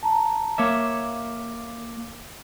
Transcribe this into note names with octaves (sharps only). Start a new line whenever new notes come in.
A5 A#5
A#3 C#5 E5 D6